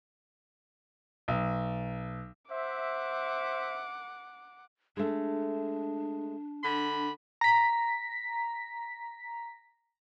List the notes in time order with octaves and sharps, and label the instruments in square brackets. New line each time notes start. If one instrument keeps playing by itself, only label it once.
[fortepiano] B1
[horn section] C5 E5 [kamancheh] F#5 D6
[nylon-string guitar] G#3 A3 [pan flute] D4
[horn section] D3 B5
[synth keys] A#5 B6